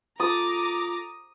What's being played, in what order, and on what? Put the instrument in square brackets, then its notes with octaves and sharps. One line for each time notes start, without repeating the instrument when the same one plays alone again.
[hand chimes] F4 [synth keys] A4 A6 [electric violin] A#5 D6 [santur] D#6